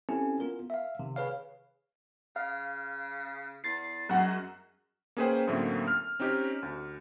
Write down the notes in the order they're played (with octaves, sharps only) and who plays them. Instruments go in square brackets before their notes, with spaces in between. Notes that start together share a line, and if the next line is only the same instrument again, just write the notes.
[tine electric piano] C4 C#4 E4 G4 A4 G#5
B3 F4 A#4
E5 F5
C3 D#3
G#4 B4 C#5 F5
[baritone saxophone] C#3 [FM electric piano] F5
[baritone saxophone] E2 [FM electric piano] A6 C7
[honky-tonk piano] F#2 F#5 [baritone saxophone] G#3
[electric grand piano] A#3 C#4 G#4 B4 C5 G5
F#2 A2 D3 A3 A#3 C4
F6
C4 C#4 D#4 G4
D2